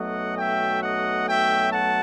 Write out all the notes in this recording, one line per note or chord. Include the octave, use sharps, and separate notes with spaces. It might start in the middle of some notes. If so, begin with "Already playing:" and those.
Already playing: B1 B2 F#3 A3 D#5 F#5
E5 G5
D#5 F#5
E5 G5
F#5 A5